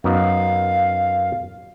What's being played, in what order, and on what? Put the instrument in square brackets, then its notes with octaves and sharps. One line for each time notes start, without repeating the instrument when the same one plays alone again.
[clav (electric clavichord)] F#2 B3 D#4 [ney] F5